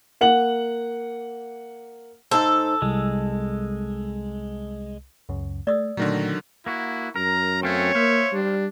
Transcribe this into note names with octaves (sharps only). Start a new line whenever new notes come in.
A#3 F#5 F#7
D#4 A4 C5
C2 G#3
C#2 F#2 C#3
A3 D5 D#6 E6
A#2 D3 D#3 F#3 A3 A#6
A#3 E4 F#4
F#2 A#4 A#5
A3 C4 C#4 C#5 F5
A#3 C5 E5 F5
G3 D4